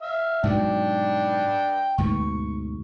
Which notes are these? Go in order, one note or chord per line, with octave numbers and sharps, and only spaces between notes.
E5 F5
G#2 B2 F#3 D4 G5
D2 G#2 B2 C#6